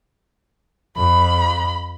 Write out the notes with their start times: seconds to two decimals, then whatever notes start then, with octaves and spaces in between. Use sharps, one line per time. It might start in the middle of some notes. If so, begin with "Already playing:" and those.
0.97 F2 B5